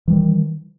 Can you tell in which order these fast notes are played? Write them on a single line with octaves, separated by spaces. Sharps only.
E3 G3 D#3